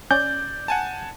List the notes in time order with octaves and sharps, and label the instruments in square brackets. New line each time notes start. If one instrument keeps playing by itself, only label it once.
[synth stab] C#4 [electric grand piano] D5 [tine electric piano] G6
[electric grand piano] F#5 G#5 A5